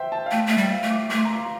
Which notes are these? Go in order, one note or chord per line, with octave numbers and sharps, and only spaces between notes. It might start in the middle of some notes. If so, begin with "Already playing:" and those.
Already playing: C5 E5 G5
A5
F5
A3 G5
A3 E5
G3
G5
F5
A3
D6
A3 D6
C6
A#5
C6